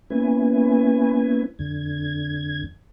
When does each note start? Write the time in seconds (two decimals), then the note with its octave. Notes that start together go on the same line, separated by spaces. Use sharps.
0.10 A#3 B3 C#4 E4 B4 G#5
1.59 F2 D3 G#6